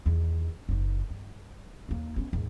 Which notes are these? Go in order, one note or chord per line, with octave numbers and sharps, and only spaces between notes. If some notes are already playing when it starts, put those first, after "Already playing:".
E2 D#3
F#1 D#4
G2
D#2 A#3
B3 C#4
D#2 G#2